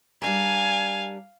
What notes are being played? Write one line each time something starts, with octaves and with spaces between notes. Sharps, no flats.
G3 D4 A#4 F5 G#5